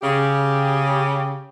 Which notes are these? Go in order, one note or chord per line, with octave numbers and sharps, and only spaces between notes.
C#3 G4